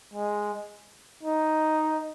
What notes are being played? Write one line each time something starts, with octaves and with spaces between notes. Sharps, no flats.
G#3
D#4